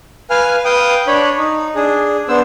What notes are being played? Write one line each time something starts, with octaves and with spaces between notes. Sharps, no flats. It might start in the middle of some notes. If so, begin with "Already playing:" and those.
B4 F5 G#5 F6
B4 F5 G5 D#6
D4 C#5 B5
D#4
D4 G#4
B3 D4 C5 E6